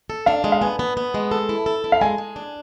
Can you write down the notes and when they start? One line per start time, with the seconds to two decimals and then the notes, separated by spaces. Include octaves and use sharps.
0.10 A4
0.26 D4 F5
0.44 G#3
0.52 F5
0.61 B3 G#5
0.79 B3
0.97 B3
1.14 G#3
1.31 A4
1.49 E4
1.66 A4
1.84 E4
1.92 F5
2.01 G#3 G#5
2.18 G#3
2.36 D4